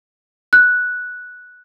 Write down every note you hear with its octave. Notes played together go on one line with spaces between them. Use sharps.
F#6